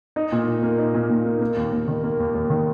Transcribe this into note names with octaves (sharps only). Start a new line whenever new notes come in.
D#4
A#2
A#2
A#3
D#4
A#2
A#2
A#3
A#3
D#2
D#2
D#3
A#3
D#2
D#2
D#3